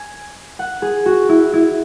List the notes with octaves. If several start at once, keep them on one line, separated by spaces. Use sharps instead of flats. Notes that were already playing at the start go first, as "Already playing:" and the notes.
Already playing: G#5
F#5
G#4
F#4
E4
E4